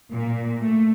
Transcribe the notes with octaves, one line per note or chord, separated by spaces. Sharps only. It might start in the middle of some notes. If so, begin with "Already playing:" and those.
A#2
A3